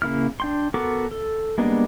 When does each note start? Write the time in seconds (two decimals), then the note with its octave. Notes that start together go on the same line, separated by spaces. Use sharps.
0.02 C#3 A#3 E4 F6
0.40 D4 G5 C6
0.74 B3 F#4 A4 A#4 D6
1.11 A4
1.58 G3 G#3 A#3 B3 D4